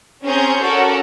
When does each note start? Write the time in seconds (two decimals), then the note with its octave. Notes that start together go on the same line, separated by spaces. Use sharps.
0.24 C4 C#4 G#4 A#5 C#6 G6
0.60 C#4 F#4 A4 A#4 D5